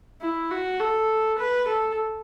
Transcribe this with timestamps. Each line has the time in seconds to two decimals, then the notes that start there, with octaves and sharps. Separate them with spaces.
0.21 E4
0.51 F#4
0.80 A4
1.39 B4
1.68 A4